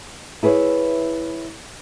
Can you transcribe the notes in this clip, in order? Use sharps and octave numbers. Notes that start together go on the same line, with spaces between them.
E4 G#4 B4 C#5